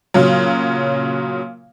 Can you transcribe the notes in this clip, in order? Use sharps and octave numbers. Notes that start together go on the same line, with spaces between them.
A#2 C#3 F#3